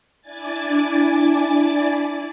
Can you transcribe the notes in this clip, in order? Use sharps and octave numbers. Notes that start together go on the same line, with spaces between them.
D4 E4 D5 G#5 A6